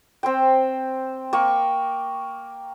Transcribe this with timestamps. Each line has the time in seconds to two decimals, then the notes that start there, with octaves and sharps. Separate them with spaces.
0.23 C4 C5 G5
1.33 A#3 G5 C#6